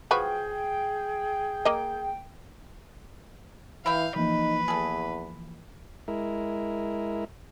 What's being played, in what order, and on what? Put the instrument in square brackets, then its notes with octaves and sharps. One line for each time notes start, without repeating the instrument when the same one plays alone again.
[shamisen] F3 F#4 B4 [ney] G#4 [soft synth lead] G5
[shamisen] A#3 D#5
[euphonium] E3 [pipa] E4 E5 G5 [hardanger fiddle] F5
[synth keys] E3 F3 A#3 [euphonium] D#4 [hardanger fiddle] B4
[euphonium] E2 [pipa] G#4 A4
[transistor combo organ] G#3 E4 A#4